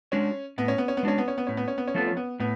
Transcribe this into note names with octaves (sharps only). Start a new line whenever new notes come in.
G#3 C#4 D4 F#4
A2 B3
C#4
B3
C#4
B3
G#3 C#4 D4 F#4
B3
C#4
B3
A2 C#4
B3
C#4
B3
C#4
F3 A3 B3 F4 A4
C#4
B3
A2 B3